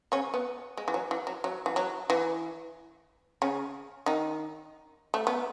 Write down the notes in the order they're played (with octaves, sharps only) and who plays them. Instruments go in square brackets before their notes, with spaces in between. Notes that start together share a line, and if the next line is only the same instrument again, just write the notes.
[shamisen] C#3 C#4
B3
G#3
E3
F#3
E3
F#3
F#3
E3
F#3
E3
C#3 C#4
D#3 D#4
A3
B3